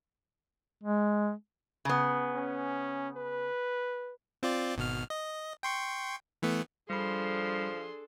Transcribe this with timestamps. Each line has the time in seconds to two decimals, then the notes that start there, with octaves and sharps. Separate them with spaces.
0.83 G#3
1.85 C#3 B3
2.34 C#4
3.17 B4
4.43 C4 F4 D5
4.77 G#1 B2 F6
5.10 D#5
5.63 G5 C6 C#6
6.42 E3 A3 B3
6.90 F3 G3 D4 G#4 A4 B5 C6